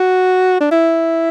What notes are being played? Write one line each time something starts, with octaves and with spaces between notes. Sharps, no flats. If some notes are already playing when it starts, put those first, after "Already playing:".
Already playing: F#4
D4
E4